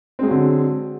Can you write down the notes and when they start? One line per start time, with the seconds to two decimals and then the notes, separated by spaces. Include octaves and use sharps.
0.19 C4
0.23 G#3
0.27 F#3
0.31 D3